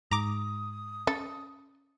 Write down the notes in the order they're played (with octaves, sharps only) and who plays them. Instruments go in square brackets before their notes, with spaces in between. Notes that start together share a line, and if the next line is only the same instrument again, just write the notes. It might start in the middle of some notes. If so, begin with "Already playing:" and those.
[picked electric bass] G#2 [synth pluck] A#5 D6 [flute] D#6
[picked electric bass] C#4 [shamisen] A4